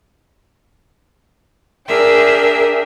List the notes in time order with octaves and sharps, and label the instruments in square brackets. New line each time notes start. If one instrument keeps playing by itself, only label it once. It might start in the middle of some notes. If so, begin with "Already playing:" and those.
[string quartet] D4 G#4 A#4 E5 G5